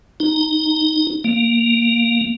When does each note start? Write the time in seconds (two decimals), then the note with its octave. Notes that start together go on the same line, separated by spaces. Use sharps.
0.20 D#4
1.24 A#3